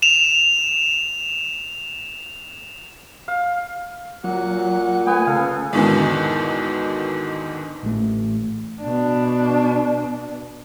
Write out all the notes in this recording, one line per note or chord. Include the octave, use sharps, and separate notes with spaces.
E7 F7
F5
A#2 F#3 F#5
A3 B3 G#5
C#3 A4 F5
E2 G#2 B2 D3 D#3
A1 A3
B2 D4